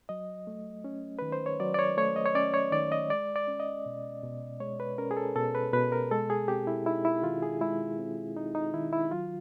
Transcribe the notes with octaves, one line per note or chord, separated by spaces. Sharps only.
F#3 D#5
A3
C#4
D#3 B4
C5
C#5
F#3 D5
D5
C#5
A3 C#5
D#5
C#5
C#4 D5
C#5
D#3 D5
D#5
G#3 D5
D5
C#4
D#5
B2
B2
G#3 C#5
B4
C#4 A#4
G#4
A4
B2 A4
B4
B2 B4
A#4
G#3 A4
G#4
C4 G4
E4
D#4 E4
E4
D#3 F4
G#4
G#3 E4
C4
D#4
D#4
D#3 E4
E4
F#3 F4